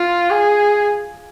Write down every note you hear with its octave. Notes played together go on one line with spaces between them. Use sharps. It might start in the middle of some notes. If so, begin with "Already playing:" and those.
Already playing: F4
G#4